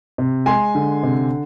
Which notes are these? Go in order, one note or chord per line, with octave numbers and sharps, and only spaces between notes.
C3
G#3 G#5 C6
D3
C3